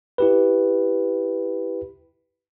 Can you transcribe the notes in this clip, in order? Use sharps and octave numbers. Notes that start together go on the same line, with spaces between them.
E4 G4 B4